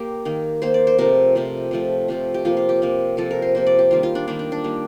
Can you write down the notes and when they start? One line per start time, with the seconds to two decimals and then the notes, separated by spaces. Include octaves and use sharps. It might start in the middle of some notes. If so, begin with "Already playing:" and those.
Already playing: A#3 G4
0.25 D#3 A#3
0.62 D#3 A#3 C5
0.74 D5
0.87 C5
0.98 C3 F3 A3 A#4
1.35 C3 F3 A3
1.71 C3 F3 A3
2.08 C3 F3 A3
2.34 G4
2.45 C3 F3 A#3 F4
2.57 F4
2.69 G4
2.82 C3 F3 A#3
3.17 C3 F3 A#3 A4
3.31 A#4
3.42 C5
3.55 C3 F3 A#3 C5
3.67 D5
3.79 G4
3.91 D#3 G3 A#3 F4
4.03 F4
4.15 D4
4.27 D#3 G3 A#3 D4
4.39 D4
4.52 D4
4.64 D#3 G3 A#3